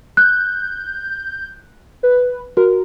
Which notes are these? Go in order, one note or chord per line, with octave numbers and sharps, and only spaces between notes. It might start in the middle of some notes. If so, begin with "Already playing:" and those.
F#6 G6
B4
F#4 A#4